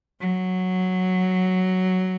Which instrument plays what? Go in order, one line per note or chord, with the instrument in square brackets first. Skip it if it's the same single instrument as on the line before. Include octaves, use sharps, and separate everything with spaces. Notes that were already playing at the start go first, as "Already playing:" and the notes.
[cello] F#3